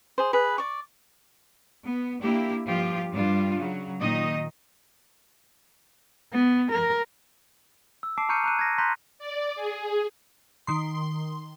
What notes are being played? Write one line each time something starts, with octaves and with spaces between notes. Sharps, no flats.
G#4 C5
G#4 B4
D5 C#6
B3
A#3 D4 E4 G4
G2 F3 F4 G4
G2 G3 D4 F4
C#3 F#3
A#2 D#3 D#4 D#5
B3
A#4
E6
A5 D6 C7 D7
A#5 C#6 F6 G6 C#7 D#7
A#5 F#6 D#7
G#6 A#6
A#5 C6 F#6 G6 A#6 B6
D5
G#4
D#3 C6